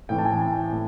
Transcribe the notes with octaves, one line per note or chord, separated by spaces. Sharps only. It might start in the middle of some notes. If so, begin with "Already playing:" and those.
A2 E3 G5
A5
G#5
A5
A2